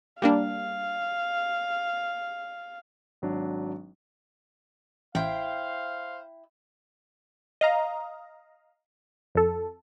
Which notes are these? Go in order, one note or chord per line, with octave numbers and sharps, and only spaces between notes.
G3 A#3 D4 F5
G#1 F#3 D4
A1 E4 C5 F5 G5
D#5 F5 A#5
F2 A4